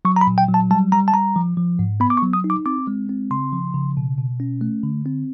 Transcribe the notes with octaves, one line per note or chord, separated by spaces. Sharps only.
F#3 C#6
A#5
B5
A#2
G5
F#3
A5
G3 A5
G3 A#5
A5
G3 A#5
F3
F3
G#2
B3 B5
D6
C#6
F#3
D#6
D#4
D6
C4 D6
G#3
C4
C#3 C6
F3
C#3
B2
B2
C#4
A3
D3
C4